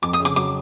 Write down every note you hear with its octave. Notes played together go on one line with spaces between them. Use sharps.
F2 D6
D#6
C#3
D6
F#3 D6